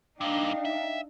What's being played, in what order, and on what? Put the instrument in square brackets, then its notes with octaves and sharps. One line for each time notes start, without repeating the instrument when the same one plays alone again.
[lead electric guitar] G2 A#3 [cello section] D4 D#4 [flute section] D#5 F5 G5
[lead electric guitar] E5